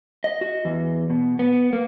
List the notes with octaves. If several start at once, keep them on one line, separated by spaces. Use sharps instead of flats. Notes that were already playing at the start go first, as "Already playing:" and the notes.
D#5
F#4
E2
B2
B3
A#3